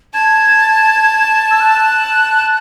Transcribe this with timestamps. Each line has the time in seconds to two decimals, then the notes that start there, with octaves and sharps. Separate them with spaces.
0.13 A5 G#6
1.51 E6
1.60 F#6